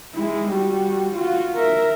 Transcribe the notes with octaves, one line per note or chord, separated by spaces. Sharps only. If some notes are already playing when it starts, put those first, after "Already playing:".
G#3 E4
G3 F#4
F4 F#4
A#4 E5